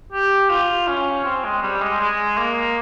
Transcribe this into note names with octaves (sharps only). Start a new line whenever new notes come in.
G4
F4
C#4
C4
G#3
G3
G#3
G#3
A#3